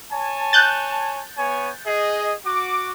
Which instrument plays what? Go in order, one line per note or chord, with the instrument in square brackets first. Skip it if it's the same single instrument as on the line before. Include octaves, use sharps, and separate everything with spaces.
[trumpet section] C#5 G#5 A5
[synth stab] F#6 G6 A6
[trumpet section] B3 C#5 G#5
G#4 D#5
F#4 D6